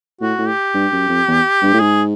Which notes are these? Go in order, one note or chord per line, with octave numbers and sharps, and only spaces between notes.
A2 F#4
A2
G4
G2
F#2
F2
E2
G2
A2
G#2 G#4